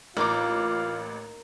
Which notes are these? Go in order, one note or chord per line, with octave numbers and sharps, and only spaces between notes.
A1 A#3 D#4 F4 F5 D6